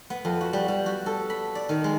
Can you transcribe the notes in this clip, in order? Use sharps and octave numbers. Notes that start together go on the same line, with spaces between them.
B3
F2
F#4
G3
G3
F#4
A4
B5
D5
D#3
G#3